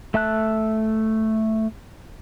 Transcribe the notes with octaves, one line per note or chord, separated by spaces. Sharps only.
A3 E5 A5 F#6